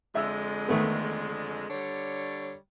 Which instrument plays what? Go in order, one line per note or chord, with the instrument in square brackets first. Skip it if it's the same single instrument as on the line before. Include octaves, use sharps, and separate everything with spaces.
[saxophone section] F2 D3 G#3 [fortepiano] E5
[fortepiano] D#3 A3 B3
[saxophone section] D3 G3 C#5